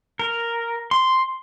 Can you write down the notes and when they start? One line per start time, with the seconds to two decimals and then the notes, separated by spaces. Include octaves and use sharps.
0.19 A#4
0.91 C6